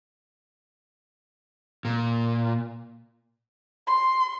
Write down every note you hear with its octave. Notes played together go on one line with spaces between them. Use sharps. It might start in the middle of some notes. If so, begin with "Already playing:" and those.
A#2
C6